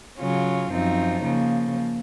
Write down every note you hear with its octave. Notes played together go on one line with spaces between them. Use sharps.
C#3 F#3 C#4 F4
F#2 F3 C4 D#4
C#3 F3 A#3